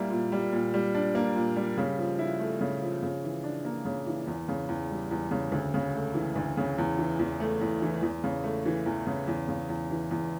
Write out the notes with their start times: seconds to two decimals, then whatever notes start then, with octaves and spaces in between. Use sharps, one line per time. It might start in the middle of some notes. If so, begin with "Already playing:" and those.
Already playing: A#2 G3 A#3 E4
0.10 A#2
0.32 G3
0.52 A#2
0.74 G3
0.95 D4
1.15 A#3
1.35 A#2
1.56 G3
1.78 C#3
1.98 F3
2.19 E4
2.40 A3
2.61 C#3
2.82 F3
3.02 C#3
3.24 E3
3.44 D4
3.65 A#3
3.85 C#3
4.07 E3
4.27 E2
4.48 C#3
4.69 E2
4.91 G3
5.11 E2
5.31 C#3
5.52 D2
5.74 C#3
5.95 A3
6.14 E3
6.36 D2
6.57 C#3
6.78 E2
6.98 E3
7.19 E2
7.40 A3
7.61 E2
7.82 E3
8.02 E2
8.24 C#3
8.44 A3
8.66 E3
8.86 E2
9.07 C#3
9.27 E2
9.48 C#3
9.69 E2
9.91 E3
10.11 E2